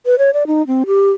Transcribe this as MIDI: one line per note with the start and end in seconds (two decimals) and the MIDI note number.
0.06 0.18 71
0.18 0.30 73
0.34 0.47 74
0.47 0.65 63
0.67 0.83 60
0.87 1.10 67